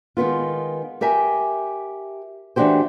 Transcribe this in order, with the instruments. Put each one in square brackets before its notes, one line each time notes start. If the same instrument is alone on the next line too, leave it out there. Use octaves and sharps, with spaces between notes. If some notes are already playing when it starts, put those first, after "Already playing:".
[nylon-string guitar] D#3 G#3 B3 F4
G4 A#4 E5 G#5
E3 A3 D4 F#4 G4 C5